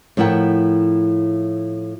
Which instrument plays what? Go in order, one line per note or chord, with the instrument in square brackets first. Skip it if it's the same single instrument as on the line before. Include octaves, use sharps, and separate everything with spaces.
[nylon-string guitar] A2 F3 E4 A#4 F#5 G5